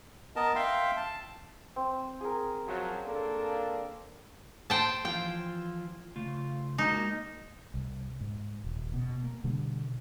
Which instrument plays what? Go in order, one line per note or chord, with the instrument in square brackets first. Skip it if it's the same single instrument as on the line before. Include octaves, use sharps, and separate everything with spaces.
[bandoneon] B3 A#4 D#5 A5
E5 F5 G5 C6
A5
[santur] C4
G#4 A#4
[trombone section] F#2 F3 F#3
A#3 D4 A4
[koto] C5 G5 A5
[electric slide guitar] E3 F3 F4 [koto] G5
[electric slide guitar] C#3 A3 F4
[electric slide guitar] G#3 A#3 F#4 [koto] D#4
[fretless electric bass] C2
G#2
D#1
B2
A#3
B2 D3 G3